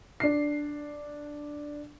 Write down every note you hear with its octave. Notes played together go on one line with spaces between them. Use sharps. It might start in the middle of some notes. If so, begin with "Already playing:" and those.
D4 C7